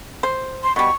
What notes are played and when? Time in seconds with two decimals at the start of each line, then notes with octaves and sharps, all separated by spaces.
0.23 C5
0.63 C6
0.76 B2 G3 C#6